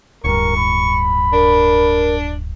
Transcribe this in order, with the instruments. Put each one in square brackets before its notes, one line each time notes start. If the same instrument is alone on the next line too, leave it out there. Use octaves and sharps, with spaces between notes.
[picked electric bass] D1 G2 [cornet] A#4 [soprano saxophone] C#6
[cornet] B5
[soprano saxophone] D4 [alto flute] A#4